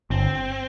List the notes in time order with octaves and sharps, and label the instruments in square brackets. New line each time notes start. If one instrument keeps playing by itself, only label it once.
[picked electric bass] G1 [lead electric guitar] C4